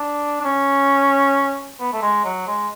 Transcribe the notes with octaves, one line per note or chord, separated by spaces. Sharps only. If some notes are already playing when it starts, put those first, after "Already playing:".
Already playing: D4
D4
C#4
B3
A3
G#3
F#3
G#3